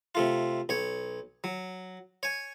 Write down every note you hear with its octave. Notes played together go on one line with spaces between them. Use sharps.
C3 A3 F4
B1 C#5
F#3
C#5 G#5